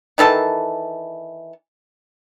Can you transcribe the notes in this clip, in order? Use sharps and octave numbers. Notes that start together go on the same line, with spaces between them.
D#3 E3 A4 A5